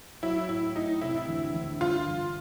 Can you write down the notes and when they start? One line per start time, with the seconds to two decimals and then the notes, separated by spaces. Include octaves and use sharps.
0.23 F#3 E4
0.49 A2 E4
0.76 A2 D#4
1.01 C3 E4
1.28 D2
1.54 D2
1.81 G2 F4
2.08 G1